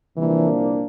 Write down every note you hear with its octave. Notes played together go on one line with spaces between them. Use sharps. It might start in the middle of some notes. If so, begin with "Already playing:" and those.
C2 A#2 E3 F3 A#3 D4